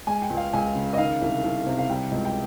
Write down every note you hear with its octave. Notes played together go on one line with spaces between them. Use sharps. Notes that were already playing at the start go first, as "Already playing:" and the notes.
G#3 G#5
G5
C#2
F5
C#2 G#5
C#3
D#5
D#3 F5
C2
C2
C3
F5
G3 G5
C#2
G5